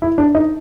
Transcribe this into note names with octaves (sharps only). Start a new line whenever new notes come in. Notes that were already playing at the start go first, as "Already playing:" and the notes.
E4
D4
D#4